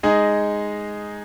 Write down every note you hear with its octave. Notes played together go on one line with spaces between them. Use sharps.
G#3 D#4 G#4 D#5